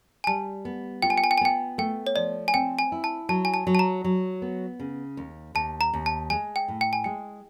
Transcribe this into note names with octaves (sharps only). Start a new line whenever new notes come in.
G#5
G3 A5
B3
F4 G5
G#5
G5
G#5
G5
G#5
B3 G5
A3 G5
C#5
F3 D5
G#5
C4 G5
G#5
E4
A5
F#3 A5
G#5
A5
F#3
A5
A#5
F#3
B3
C#3
D#2
D#2 A5
A#5
D#2
A5
G#3 G#5
G5
A2
G5
G#5
G#3 G5